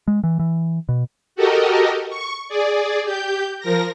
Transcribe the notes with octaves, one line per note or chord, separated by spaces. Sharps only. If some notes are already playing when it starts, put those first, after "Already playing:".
G#3
E3
E3
B2
F#4 G4 A4 A#4 D#5
C#6
G#4 D5
G4 G6
F3 A#4 A#6